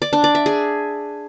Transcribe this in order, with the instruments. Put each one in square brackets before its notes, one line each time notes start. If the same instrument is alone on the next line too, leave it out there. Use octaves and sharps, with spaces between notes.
[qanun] D5
D4
D5
E5
G#4